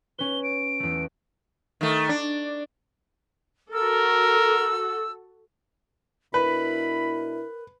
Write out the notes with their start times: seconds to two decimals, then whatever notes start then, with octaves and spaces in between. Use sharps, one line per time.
0.19 C#4 B4 G7
0.43 D7
0.80 E2 A3
1.81 D#3 A3
2.09 D4
3.73 F#4 A4 A#4 E6
6.34 B2 D4 E4 A#4 B4 B5